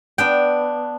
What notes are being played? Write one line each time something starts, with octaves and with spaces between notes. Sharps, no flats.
B3 D4 G5